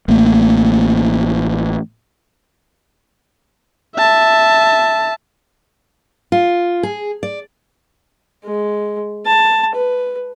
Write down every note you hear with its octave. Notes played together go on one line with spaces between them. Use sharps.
A1 A3 A#3
E5 A5
F4
G#4
D5
G#3
A5
B4